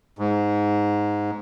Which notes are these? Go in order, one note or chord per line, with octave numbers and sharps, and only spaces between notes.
G#2